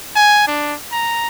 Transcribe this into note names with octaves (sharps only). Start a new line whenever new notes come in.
G#5
D4
A#5